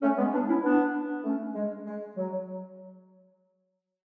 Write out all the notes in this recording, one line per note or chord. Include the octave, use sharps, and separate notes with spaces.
A3 C#4
G#3 B3
B3 D4
C#4 E4
B3 D4
A3 C#4
G#3
G#3
F#3